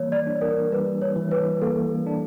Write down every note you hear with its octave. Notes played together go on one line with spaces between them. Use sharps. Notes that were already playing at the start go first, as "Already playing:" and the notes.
Already playing: E3 G3 A#3 C#5
D5
D4
A#4
G3 B4
C#5
E3
B4
A#3 A4
D4